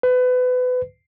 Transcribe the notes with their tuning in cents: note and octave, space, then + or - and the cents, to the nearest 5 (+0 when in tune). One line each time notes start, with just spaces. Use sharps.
B4 +30